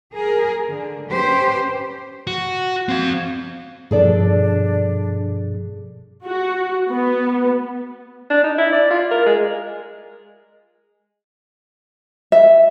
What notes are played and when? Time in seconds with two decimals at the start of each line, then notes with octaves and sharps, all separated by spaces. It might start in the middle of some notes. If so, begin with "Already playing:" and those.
0.14 G#4 A#4
0.70 D3
1.10 C#4 G4 B4 C5
2.27 F#4
2.89 C4 F5
3.91 G2 B2 F3 D4 G#4 A4 D5
6.25 F#4
6.90 B3
8.30 D4
8.44 D#4
8.58 E4
8.72 D5
8.91 F4
9.11 A#4
9.26 G#3
12.32 E5